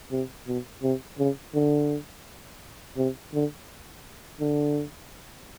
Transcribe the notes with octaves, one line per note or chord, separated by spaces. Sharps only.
C3
B2
C3
C#3
D3
C3
D3
D3